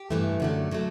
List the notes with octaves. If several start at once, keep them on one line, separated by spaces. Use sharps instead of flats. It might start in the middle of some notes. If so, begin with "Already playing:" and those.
Already playing: G4
G2 E3 A3
F#2 D3 F#3 A3
D3 F#3 A3